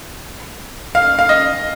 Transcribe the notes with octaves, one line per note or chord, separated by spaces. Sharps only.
F5
F5
D#5